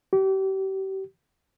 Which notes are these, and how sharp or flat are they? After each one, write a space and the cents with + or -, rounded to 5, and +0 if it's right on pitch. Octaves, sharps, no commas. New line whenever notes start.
G4 -35